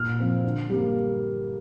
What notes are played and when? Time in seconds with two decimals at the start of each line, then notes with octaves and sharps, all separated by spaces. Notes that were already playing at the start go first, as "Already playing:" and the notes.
Already playing: A#2 F6
0.19 F3 C4
0.44 D3
0.70 G3 A#3